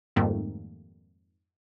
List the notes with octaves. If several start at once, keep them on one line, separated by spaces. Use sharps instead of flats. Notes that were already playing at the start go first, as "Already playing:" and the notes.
F2 G#2 D#3 G3 A3 A#3